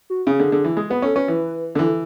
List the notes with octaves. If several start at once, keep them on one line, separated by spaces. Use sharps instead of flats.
F#4
C#3 G#4
D3
D3
E3
G#3 G#4
B3 B4
C#4 A4
C#4 B4
E3 B4
D3
E3 A4